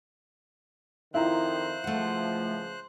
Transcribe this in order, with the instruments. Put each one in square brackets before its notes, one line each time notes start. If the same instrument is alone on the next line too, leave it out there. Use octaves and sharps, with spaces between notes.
[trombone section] F2 D#3 [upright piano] E4 F4 A#5 [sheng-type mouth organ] C5 F#6
[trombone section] C#2 F3 [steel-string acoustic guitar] A3 F#5